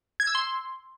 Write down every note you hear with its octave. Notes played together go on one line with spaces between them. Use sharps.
G#6
E6
C6